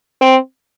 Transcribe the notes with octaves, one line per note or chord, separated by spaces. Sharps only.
C4